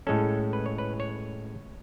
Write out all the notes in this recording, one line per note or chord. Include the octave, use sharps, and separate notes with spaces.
A2 G#3 C#4 A4
B4
C#5
B4
C#5